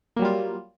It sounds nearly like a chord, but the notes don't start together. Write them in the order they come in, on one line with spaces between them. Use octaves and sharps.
A#3 F#3 G3 F4